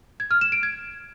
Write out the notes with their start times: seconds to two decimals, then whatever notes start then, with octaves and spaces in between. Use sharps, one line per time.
0.20 G#6
0.31 F6
0.41 E7
0.52 D7
0.63 G#6